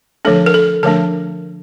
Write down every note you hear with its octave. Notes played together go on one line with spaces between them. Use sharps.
D3 F3 A3 D4 A4
A#4
A4
D3 F3 A3 D4 A#4